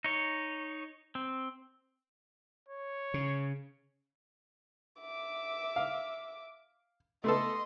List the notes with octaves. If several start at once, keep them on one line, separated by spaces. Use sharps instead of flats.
D#4 C#5
C4
C#5
C#3
E5 D6
F5
A3 B3 A4 D#5 C6